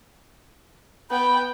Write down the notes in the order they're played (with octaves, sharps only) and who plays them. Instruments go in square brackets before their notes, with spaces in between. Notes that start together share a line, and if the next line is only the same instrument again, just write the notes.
[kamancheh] B3 G5 [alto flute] B5